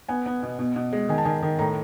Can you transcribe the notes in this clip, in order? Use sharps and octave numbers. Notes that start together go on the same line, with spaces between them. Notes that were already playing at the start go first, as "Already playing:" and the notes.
B3 G#5
B3
B2
B2
B2
G#3
D#3 G#5
A5
D#3 G#5
D#3
A2 A#5